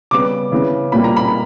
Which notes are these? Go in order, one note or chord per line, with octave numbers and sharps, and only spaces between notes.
C#3 G3 B3 D6
C#3 E3 B3
A#2 G3 A#3 B5
A#5
B5